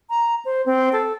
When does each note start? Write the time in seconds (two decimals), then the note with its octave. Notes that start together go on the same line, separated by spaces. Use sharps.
0.10 A#5
0.45 C5
0.66 C4
0.93 A4